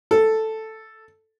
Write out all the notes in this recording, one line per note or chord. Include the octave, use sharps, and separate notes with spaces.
A4